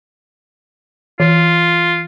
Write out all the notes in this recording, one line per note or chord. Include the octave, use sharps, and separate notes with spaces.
E3 F4